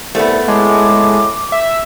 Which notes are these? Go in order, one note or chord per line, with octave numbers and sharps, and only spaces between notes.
C2 A3 B3
A2 G#3 D6
E5